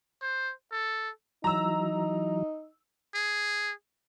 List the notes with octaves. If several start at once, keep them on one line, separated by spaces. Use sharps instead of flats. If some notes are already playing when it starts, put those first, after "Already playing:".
C5
A4
E3 F#3 D#4 A#5 E6
G#4